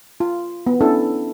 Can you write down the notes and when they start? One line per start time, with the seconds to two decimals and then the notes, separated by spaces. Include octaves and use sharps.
0.20 F4
0.67 B3
0.81 C#4 D4 E4 A4